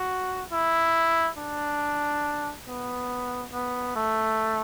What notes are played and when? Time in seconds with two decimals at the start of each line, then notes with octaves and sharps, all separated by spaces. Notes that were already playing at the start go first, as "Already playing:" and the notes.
Already playing: F#4
0.52 E4
1.38 D4
2.67 B3
3.52 B3
3.95 A3